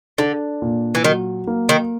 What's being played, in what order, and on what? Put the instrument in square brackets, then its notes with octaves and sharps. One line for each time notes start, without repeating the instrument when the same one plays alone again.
[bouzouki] D3 [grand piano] D4
[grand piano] A#2
[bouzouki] E3
[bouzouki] D#3 [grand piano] F#3
[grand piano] A#3
[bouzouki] D#3